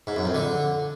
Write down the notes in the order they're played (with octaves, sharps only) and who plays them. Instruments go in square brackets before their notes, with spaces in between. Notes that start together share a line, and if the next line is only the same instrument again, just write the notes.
[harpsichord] G#2
F#2
F2
D3